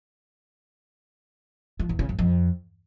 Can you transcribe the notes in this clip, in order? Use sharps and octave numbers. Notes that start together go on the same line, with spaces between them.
F3
E2
C#3
F#2
F2